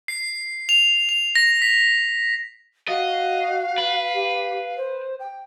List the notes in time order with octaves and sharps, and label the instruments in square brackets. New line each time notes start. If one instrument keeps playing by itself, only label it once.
[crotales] C7
F7
F7
A#6
B6
[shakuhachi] F#4 [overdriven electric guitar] D#5 [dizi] F5
[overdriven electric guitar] B4
[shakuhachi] G4
C5
G5